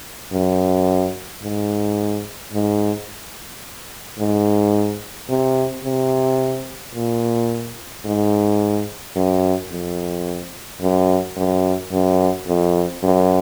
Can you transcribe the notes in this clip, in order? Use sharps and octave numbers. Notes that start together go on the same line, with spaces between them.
F#2
G#2
G#2
G#2
C3
C3
A#2
G#2
F#2
F2
F#2
F#2
F#2
F2
F#2